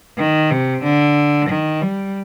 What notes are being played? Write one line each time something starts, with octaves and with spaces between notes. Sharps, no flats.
D#3
C3
D3
D#3
G3